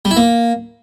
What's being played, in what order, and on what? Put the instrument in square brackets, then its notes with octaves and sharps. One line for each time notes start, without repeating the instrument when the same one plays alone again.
[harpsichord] G3
E4
A#3